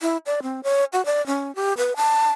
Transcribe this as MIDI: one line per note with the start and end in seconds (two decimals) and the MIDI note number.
0.01 0.17 64
0.26 0.40 74
0.42 0.61 60
0.64 0.84 73
0.93 1.04 66
1.06 1.25 74
1.26 1.54 61
1.55 1.73 67
1.77 1.96 71
1.96 2.32 81